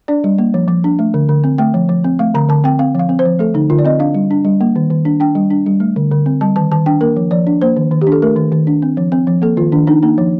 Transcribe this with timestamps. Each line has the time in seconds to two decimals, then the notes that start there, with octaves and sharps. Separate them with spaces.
0.08 D4 D5
0.24 G3
0.38 A#3
0.54 F3
0.68 F3
0.84 D4
0.99 A3
1.14 D3
1.29 D3
1.44 C4
1.58 A3 G5
1.74 F3
1.89 F3
2.04 C4
2.19 A3 F5
2.34 D3 A#5
2.49 D3 A5
2.64 C4 G5
2.79 C4 F5
2.95 F3 F5
3.09 C4
3.19 C5
3.25 F3
3.39 A3 A4
3.54 D3 D#4
3.70 D3 F4
3.79 D5
3.85 C4 D#5
3.99 D4 F5
4.14 G3
4.31 D4
4.45 G3
4.61 A#3
4.76 D#3
4.90 D#3
5.05 D4
5.20 D4 G5
5.35 G3
5.51 D4
5.66 G3
5.80 A3
5.96 D3
6.11 D3
6.26 C4
6.41 G3 A5
6.56 D#3 A5
6.72 D#3 A5
6.86 D4 G5
7.01 A#3 A#4
7.17 F3
7.31 F3 D5
7.47 D4
7.62 A#3 C5
7.76 D#3
7.91 D#3
8.02 G4
8.07 D4
8.12 A4
8.22 A3 A#4
8.36 D#3
8.52 D#3
8.67 D4
8.82 C4
8.97 F3
9.12 C4
9.27 F3
9.42 A#3 A4
9.57 D#3 F4
9.72 D#3 D4
9.87 D4 D#4
10.03 A#3 D#4
10.18 F3